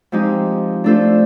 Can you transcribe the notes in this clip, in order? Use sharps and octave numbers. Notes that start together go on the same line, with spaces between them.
F3 G#3 C4 D#4 G4
A3 D4 F4 A4 C5